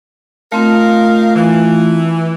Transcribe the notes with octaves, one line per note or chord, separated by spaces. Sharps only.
A3 C4 D#4 F4 A#4 F5
E3